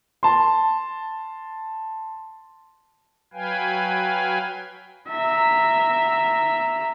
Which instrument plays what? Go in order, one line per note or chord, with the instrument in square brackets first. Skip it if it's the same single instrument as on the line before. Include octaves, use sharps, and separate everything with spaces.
[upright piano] A5 C6
[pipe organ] F#3 B4 F5 G5 G#5
[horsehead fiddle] E5 A#5